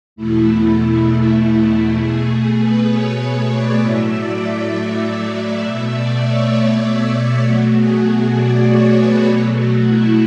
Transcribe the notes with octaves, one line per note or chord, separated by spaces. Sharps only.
E2 B2 A3 E4
B2 A3 G#4
B4
C#5
C#5
D5
A2 F#3 A3 E5
D5
E5
E5
E5
D5
B2 A3 E5
D5
C#5
E5
B2 F#3 A3 F#4
G#4
G#4
D5
C#5
B4
B2 F#3 A3
F#4
E4